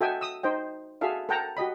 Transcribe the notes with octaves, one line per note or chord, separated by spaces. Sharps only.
F#4 A4 D#5 E5 G5 G#5
D#6 E6
D#4 C5 D#5 G5
F#4 G#4 A4 E5 F5
A4 A#4 F#5 G5 A5 A#5
F#4 G4 D#5 B5